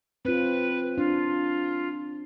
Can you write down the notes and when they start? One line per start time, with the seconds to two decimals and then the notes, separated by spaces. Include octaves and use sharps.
0.25 C4 F4 B4
0.98 D4 F4